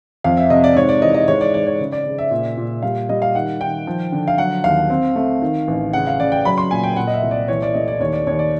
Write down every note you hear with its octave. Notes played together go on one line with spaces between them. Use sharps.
F2 F5
E5
C3 D#5
D5
G#2 C#5
D5
E3 D#5
D#5
G#2 C#5
D5
G#2 D5
C#5
C#3
D5
C#3
E5
A#2
A#2
G3 F5
G3 D#5
F5
D#3 F#5
D#3 G5
F3
D3
F5
F#3 F#5
D#2 F5
C4
A3
D#3
A1
C#3 F#5
F5
C#3 D5
G5
F#3 B5
C6
A#2 G#5
G5
A#2 F#5
D#5
E5
C2
D5
E3 C#5
D5
A3 D#5
D5
D#2 C#5
D5
D#2 C#5
D5